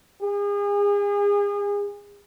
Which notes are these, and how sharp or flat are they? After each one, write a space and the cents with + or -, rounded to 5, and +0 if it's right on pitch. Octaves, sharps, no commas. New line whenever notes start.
G#4 -35